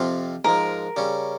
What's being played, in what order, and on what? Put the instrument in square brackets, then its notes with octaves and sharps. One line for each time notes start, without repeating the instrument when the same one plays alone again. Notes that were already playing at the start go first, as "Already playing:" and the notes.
Already playing: [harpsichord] F2 C3 F3 C4 F4
[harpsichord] G#2 F3 G#3 [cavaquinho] A#4
[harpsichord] C#3 G3 C#4